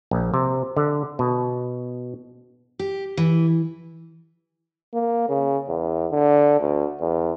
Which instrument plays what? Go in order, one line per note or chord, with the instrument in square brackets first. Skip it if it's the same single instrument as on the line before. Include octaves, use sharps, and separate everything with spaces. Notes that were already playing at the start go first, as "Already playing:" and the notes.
[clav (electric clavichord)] A#1
C3
D3
B2
[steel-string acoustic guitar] G4
E3
[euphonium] A#3
C#3
E2
D3
D2
E2